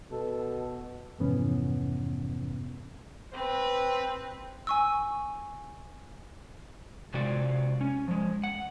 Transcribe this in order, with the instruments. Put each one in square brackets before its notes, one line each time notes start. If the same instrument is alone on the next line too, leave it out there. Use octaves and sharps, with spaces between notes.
[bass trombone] B2 [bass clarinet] A4
[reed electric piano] F2 G#2 C3 E3 B3 C#4
[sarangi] C4 [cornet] B4
[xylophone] G#5 C#6 E6
[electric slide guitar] C3 G#3 F4 F#4 D5
C#4
F3 G#3
F#5